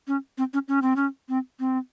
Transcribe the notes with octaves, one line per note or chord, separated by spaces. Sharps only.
C#4
C4
C#4
C#4
C4
C#4
C4
C4